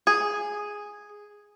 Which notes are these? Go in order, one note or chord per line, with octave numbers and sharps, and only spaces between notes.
G#4